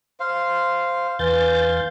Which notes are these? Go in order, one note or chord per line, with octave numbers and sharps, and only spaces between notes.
C5 F5
E2 B4 F5 G#5 C6 G6 A6